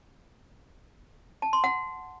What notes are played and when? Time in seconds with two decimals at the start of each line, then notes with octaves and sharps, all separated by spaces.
1.42 A5
1.53 C6
1.64 F#5